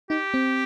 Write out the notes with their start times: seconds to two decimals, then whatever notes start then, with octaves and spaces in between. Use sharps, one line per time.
0.10 D#4 G4
0.34 C4